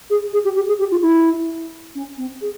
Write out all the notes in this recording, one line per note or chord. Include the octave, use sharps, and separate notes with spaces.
G#4
G#4
G4
G4
G#4
G4
F4
E4
C#4
C4
G#4